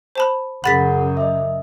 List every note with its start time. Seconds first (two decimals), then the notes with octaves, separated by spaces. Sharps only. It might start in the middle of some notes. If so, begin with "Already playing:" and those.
0.15 C5 A5 B5
0.64 F#2 C#3 G#4 F#5 B5 A6 B6
1.17 D#5 E5